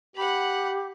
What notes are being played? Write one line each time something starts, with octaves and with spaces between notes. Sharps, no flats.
G4 F#5 B5